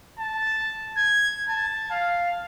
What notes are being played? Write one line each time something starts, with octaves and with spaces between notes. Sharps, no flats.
A5
G#6
A5
F5